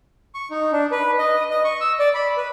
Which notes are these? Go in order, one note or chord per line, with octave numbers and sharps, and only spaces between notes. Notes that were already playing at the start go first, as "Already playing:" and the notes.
C#6
D#4
D4
B4
D#5
D#5
C#6
E6
D5
B5
B4